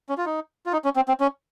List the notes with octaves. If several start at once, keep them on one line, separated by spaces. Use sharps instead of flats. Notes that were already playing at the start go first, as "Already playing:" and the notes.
C#4
F4
D#4
F4
D#4
C#4
C4
C4
C#4